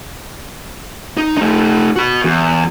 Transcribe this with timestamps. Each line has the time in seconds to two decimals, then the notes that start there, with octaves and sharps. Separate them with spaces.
1.17 D#4
1.37 A3 D#4
1.96 F#4 B5
2.24 E2